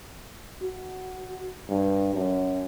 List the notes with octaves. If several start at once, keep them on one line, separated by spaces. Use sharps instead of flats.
F#4
G2
F#2